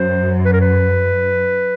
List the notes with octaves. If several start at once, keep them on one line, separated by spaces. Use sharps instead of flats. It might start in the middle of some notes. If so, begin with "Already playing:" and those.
Already playing: F#2 C5
B4
A#4
B4